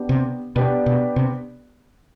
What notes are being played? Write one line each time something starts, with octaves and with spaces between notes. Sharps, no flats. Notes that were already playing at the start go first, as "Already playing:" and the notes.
Already playing: B3 D4 G4
C3
B2 B3 D4 G4 B4 D5
B2
C3